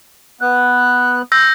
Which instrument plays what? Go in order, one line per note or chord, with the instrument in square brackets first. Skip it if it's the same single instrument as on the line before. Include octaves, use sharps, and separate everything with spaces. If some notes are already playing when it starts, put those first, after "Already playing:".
[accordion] B3 F#6
[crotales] E6 G6 A#6